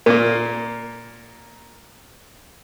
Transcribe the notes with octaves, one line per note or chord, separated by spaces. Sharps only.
A#2 A#3 A#4